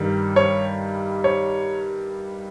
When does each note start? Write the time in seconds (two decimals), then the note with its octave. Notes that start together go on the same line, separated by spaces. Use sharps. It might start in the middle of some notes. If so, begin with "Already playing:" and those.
Already playing: G2 D#3 G3
0.36 C#5
1.24 C#5